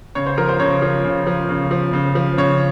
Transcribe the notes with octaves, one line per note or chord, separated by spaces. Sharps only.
C#3 C#5
C5
F3 A#4
C5
C#3 C#5
F3
C#3
F3
C#3
F3
C#3
F3
C#3 C#5